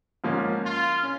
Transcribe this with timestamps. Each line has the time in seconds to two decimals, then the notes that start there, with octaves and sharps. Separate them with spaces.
0.24 G#2 F3 A#3 C#4
0.64 F4
1.03 C#4